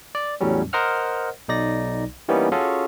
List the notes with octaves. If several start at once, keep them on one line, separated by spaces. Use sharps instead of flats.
D5
E2 A2 F#3 G3 C#4
A#4 C5 D#5 F#5 F6
B1 D#4 D5 A#6
E3 G3 A#3 B3 C#4 D#4
C#4 F4 F#4 G#4 A4